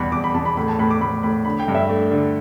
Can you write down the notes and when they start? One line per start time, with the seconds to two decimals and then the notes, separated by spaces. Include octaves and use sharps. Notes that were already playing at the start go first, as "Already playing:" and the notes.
Already playing: E2 B2 G3 B5
0.12 E2 D6
0.24 B5
0.34 E2 A5
0.46 B5
0.57 A2 B5
0.68 A5
0.79 A2 B5
0.91 D6
1.01 A2 B5
1.23 A2 B5
1.45 D3 B5
1.60 G5
1.68 G2
1.75 E5
1.89 A3
2.11 D3